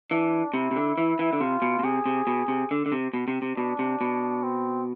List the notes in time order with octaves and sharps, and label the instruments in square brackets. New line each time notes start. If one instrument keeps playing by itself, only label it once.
[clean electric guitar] E3 [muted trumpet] D4
[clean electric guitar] C3 [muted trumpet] E4
[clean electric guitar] C3
D3
E3
E3
D3
[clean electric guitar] C3 [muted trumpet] F4
[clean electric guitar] B2
B2
[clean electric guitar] C3 [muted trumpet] G#4
[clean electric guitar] C3
B2
C3
D3
D3
C3
B2
C3
C3
[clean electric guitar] B2 [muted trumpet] D4
[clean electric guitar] C3
B2
[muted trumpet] C4